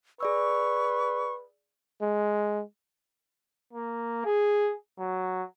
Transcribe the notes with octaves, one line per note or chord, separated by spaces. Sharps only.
G#4 B4 D5 C#6 E6
G#3
A#3
G#4
F#3